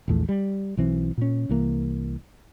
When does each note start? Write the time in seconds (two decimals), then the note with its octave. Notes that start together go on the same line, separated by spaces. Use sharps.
0.08 A#1 E2 A3
0.29 G3
0.77 B1 E3 C4
1.18 A#2 C#4
1.49 C2 E3 A#3